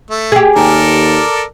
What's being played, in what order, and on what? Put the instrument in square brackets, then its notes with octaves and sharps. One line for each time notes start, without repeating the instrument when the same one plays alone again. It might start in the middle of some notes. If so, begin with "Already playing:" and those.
[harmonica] A3
[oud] G4 G#4
[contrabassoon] D#2 [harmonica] A4 A#4 D5